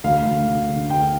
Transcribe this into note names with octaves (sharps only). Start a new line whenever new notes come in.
D2 F5
D2
D3
D3
D2 G5